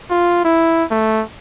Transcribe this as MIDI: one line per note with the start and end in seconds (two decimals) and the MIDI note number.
0.11 0.43 65
0.45 0.84 64
0.91 1.23 57